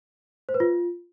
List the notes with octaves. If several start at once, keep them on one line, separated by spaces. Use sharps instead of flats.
C5
B4
F4